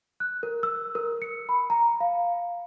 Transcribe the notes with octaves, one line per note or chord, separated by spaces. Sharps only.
F#6
A#4
E6
A#4
C#7
B5
A#5
F5